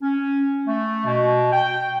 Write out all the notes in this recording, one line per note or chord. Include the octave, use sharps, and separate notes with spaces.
C#4
A3
B2
G5